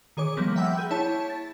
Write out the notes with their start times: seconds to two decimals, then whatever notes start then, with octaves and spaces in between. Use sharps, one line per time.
0.17 D#3 G#4 C#5 D6
0.37 F3 G3 A#3 B3
0.56 E5 F#5 G5 B5 E6
0.77 G#4 G6
0.91 E4 C#5 A5
1.30 A6